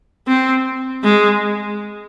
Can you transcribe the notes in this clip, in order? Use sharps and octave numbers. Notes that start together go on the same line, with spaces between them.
C4
G#3